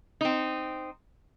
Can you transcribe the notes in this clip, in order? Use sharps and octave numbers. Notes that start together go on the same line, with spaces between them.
C4 D#4